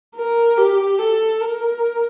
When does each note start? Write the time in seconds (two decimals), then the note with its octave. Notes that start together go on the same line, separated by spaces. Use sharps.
0.16 A#4
0.58 G4
0.99 A4
1.40 A#4